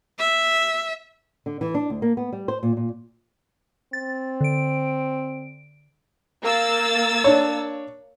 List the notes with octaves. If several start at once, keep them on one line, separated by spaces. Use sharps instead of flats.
E5
D3
E3
D4
D2
A#3
B3
G3
C5
A#2
A#2
C4 A6
D3 D7
A#3 E6 A6
D4 C#5